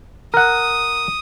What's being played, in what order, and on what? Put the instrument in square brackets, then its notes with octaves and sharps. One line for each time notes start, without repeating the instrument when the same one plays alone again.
[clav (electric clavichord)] A#4 F#5 [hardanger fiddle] D#6